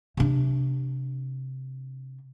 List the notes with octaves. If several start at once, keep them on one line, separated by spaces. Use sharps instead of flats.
C3 D4